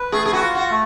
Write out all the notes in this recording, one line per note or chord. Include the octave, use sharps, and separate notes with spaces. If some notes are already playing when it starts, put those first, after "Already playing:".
Already playing: B4
A3 G#4
G#4
F#4
F4
F#4
A3